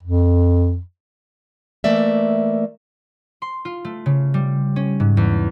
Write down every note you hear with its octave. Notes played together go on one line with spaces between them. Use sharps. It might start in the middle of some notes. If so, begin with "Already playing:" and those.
F2
E3 A3 A#3 D5 E5
C6
F4
A3
C#3
G3
C#4
G#2
E2